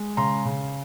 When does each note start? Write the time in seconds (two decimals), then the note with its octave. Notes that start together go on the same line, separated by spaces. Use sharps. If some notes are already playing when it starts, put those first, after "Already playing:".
Already playing: G#3
0.17 C#3 A#5 C6
0.45 C#3